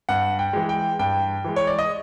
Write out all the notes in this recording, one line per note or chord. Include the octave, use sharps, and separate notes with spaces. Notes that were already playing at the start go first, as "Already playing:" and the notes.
G2 F#5
G5
E3 G#3
G5
G2 G5
E3 G#3
C#5
D5
D#5